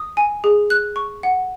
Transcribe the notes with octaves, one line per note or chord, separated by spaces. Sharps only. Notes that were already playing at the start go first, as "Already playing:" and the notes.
Already playing: D#6
G#5
G#4
F#6
C#6
F#5